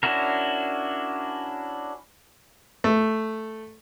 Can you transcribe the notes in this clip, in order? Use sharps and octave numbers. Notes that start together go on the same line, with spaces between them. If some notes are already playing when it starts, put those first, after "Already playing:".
C#4 D4 E4 F#4 A#4
A3